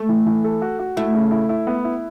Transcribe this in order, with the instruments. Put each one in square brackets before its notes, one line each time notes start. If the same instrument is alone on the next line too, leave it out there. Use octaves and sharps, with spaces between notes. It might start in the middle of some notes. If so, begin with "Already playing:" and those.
Already playing: [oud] A3
[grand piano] E3
E3
A4
F#4
F#4
[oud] A3 [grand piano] E4
[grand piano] C#3
E4
E4
B3
E4